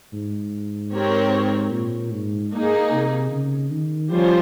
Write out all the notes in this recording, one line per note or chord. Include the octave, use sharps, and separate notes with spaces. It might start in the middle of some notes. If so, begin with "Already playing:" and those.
G#2
C4 G4 A#4 C#5
A#2
G#2
A#3 D#4 G#4
C3
C#3
D#3
F3 G3 C#4 F4 C5